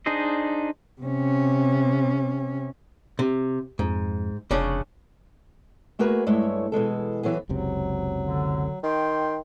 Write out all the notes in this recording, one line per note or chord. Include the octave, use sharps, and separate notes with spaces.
D4 D#4 G#4 C5 D#5
C3 C#4
C3
F2 G#2
F1 C#3 C#4 D4
A3 A#3 F#4 G#4 A#4 B4
G2 G#3 A3 E4 C#5
B2 E3 G#3 A4
E3 F#3 B3 G#4
F#1 C#2 C3 F#3
D3
D#3 G5 C6